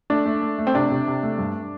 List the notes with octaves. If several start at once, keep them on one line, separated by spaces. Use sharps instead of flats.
A3 D4
A3
A3
A3
C4
C3 D4
C3
C3
A3
G2